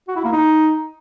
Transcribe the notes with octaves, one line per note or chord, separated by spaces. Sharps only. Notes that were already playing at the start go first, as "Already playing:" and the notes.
F#4
E4
A#3
D#4